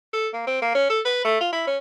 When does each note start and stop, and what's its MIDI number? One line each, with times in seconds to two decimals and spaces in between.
0.13 0.28 69
0.34 0.43 58
0.47 0.61 60
0.62 0.71 58
0.75 0.86 61
0.90 1.00 69
1.05 1.20 71
1.25 1.40 57
1.41 1.50 65
1.53 1.67 64
1.67 1.78 61